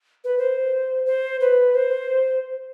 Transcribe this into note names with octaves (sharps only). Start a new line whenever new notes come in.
B4
C5
C5
B4
C5